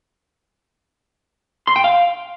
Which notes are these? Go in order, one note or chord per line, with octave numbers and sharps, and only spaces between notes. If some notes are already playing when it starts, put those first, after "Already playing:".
C6
G5
F5